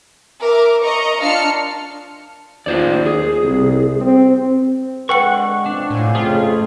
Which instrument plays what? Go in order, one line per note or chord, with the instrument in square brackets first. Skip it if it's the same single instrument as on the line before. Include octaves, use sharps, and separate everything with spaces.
[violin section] A#4 E5 D6
D#5 A#5 C#6
D4 F4 A5 F6 C#7
[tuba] D#2 [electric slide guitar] F4 C5 D5
[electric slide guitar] G#4
[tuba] C2
C4
[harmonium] D3 G#3 [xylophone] B4 G5 C#7 [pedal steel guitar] F#5 C#6
[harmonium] F3 C4 [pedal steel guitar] D4
[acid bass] A2 [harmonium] F4 C5 G#5
[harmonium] F2 C#3 C4 [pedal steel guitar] A3 G#4 [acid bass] F4